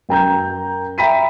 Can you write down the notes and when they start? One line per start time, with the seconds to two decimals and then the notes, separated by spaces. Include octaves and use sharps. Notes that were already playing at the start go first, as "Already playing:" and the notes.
0.09 F#2 G5 A#5 G6
0.98 E5 G5 A#5 B5 B6 D#7